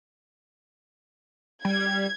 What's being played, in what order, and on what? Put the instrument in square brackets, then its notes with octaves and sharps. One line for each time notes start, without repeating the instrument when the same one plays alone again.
[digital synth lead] G3 [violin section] G#6